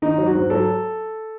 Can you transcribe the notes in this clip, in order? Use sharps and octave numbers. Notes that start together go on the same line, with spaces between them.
D#3 D#4
F#3
F#4
G#2
F#3 A4